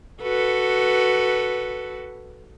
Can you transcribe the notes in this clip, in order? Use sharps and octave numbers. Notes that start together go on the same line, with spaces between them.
F#4 A4 B4